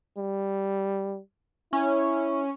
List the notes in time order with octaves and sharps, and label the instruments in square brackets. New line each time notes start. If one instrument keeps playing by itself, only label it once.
[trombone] G3
[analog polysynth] C#4 [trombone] E4